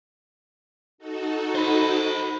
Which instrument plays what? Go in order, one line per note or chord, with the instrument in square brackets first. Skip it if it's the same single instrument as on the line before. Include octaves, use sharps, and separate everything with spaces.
[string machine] D#4 F#4 A4
[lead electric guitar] C5 B5